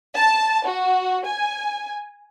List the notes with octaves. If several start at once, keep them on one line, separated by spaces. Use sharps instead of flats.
A5
F#4
G#5